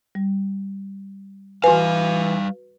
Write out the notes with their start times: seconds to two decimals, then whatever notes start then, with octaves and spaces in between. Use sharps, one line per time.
0.15 G3
1.64 E3 G3 F#4 B4 F5 G#5